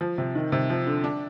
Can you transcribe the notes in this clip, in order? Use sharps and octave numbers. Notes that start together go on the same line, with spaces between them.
F3
C3
D#3
C3
F3
D3
D4